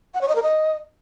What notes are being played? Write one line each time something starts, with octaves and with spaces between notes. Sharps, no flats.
F#5
C#5
D#5
A#4
D#5